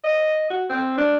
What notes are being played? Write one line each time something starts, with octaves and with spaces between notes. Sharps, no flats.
D#5
F#4
C4
D4